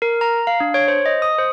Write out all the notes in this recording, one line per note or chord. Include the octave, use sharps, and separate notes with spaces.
A#4
A#5
F5
D4
C#5
C5
D#5
D#6
C5